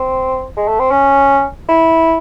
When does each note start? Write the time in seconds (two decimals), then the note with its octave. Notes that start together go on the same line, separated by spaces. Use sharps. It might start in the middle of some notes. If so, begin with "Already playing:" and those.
Already playing: C4
0.57 G#3
0.68 A3
0.80 C4
0.91 C#4
1.69 E4